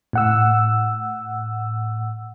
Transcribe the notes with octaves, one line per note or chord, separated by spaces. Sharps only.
A2 F#5 E6